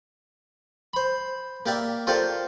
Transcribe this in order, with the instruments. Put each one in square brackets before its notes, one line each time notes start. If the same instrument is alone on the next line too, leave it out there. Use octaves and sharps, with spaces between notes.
[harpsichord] C5 B5
A#3 G4 D5 E5
F4 G4 A4 A#4 C5 D5